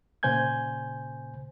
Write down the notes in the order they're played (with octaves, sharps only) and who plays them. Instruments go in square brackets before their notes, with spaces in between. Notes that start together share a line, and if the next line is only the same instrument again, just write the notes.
[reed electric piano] A#2 C#3 C5 G#5 G6 G#6